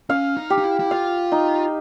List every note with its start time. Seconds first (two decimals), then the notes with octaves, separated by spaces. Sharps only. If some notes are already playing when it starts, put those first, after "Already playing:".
0.10 C#4 F5
0.37 D#4
0.50 G4
0.58 D#4
0.64 E4
0.80 E4
0.91 F4 F5
1.32 D#4